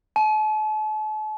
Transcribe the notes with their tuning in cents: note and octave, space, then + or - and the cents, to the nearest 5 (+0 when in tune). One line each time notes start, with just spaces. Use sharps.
A5 -40